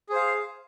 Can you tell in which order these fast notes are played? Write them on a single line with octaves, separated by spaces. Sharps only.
G#4 C5 F5